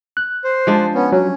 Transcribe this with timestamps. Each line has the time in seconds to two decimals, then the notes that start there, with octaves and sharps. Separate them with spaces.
0.17 F#6
0.44 C5
0.67 F3 G#3 D4
0.95 B3 C#4
1.12 F#3 C#4